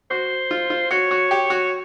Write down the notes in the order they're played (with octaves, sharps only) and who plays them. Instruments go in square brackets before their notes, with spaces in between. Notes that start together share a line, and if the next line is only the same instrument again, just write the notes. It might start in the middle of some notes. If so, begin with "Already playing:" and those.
[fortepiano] F#4 [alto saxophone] C5
[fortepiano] F4
F4
[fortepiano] F#4 [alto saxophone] C#5
[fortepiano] F#4
G4
F#4